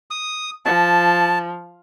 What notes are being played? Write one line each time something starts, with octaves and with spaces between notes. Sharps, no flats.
D#6
F3 A5